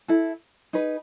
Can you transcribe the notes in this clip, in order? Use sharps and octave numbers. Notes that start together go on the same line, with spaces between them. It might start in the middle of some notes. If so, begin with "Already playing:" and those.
E4 A4
D#4 G#4 B4